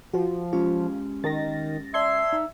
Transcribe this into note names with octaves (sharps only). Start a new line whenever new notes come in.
F3 F#4
G#3 C#4 F4 G4
D#3 A6 A#6
D5 E5 A5 C6 G#6
D#4